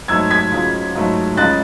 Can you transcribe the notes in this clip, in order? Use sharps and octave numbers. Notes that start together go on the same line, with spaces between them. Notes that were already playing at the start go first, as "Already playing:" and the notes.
G#2 F#3 A3 E6 G#6
G#6 B6
C#2 C#3 F#3
G#2 F#3 A3
C#2 C#3 G#3 F#6 A6